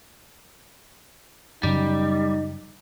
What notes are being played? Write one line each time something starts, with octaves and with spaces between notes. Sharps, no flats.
F#2 C#3 G3 D#4